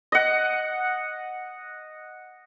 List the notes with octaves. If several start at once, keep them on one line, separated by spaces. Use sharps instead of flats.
D#5 F#5